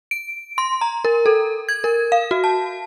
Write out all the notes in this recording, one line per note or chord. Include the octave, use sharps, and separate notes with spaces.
D7
C6
A#5
A#4
A4
G#6
A#4
F5
F#4
A5